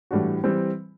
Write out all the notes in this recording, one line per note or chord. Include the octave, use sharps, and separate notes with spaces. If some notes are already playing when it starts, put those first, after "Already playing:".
A2 E3 G3 D4 F#4
E3 G3 C4